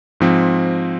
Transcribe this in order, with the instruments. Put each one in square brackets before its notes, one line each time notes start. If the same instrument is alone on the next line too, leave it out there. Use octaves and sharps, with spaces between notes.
[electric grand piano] G#2 F3 C4